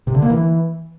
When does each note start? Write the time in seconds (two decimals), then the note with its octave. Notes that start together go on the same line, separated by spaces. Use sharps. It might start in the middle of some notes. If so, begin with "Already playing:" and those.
0.07 C3
0.15 D3
0.22 A#3
0.30 E3